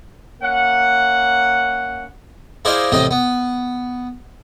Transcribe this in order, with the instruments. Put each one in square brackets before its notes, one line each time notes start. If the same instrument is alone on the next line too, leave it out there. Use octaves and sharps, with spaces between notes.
[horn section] A#3 C#4 F#5
[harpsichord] E4 G#4 C5 D5 D#5 F5
A1 A2 C3 C4 D#5 C6
B3